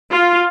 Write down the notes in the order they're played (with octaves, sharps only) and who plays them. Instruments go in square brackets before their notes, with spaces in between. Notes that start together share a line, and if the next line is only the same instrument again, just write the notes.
[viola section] F4